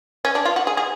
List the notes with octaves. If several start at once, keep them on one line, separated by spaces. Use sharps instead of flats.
C#4
D4
F4
F#4
G#4
G#4